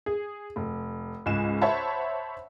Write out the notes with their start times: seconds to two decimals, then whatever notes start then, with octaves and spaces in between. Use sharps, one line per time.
0.06 G#4
0.56 F1
1.26 C#2 G#2 G#5 E7
1.61 C5 C#5 E5 F#5 A5 B5